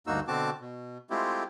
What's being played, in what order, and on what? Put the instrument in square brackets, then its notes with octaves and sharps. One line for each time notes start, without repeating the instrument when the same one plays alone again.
[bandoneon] D2 G2 A#3 D#4 F#4 E6
B2 D3 C4 F#4 A5 D6
B2
G#3 A3 C4 E4 F4 G4